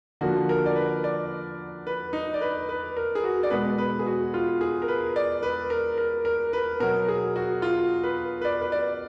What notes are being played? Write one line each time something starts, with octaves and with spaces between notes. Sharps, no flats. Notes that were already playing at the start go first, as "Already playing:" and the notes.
D3 F3 A#3 F#4
A#4
D5
B4
D5
B4
D#4
D5
B4
B4
A#4
G#4
F#4
D5
B2 G#3 B3 B4
B4
G#4
F#4
F4
G#4
A#4
B4
D5
B4
A#4
A#4
A#4
B4
B2 F#3 B3 A#4
G#4
F#4
F4
B4
B4
D5
B4
D5